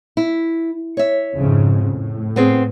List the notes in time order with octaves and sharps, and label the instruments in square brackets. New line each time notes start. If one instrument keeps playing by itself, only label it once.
[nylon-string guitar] E4
C#5 E5
[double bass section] F2 G#2 C#3
A2
[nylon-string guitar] B3 C4 G#4